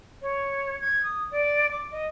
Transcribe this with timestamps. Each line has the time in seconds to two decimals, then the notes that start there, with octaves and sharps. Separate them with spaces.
0.22 C#5
0.81 G#6
1.04 D#6
1.31 D5
1.71 D6
1.92 D#5